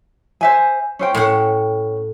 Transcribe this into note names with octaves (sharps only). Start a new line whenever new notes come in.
C5 E5 G#5
C#4 C5 G5
A2 C#4 F#5 G5